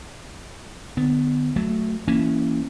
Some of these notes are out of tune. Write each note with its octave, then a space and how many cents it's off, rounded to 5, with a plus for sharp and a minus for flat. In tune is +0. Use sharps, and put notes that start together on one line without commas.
D3 +30 B3 +15
F#3 +0 A3 +0
E3 +0 A#3 -15 C#4 +0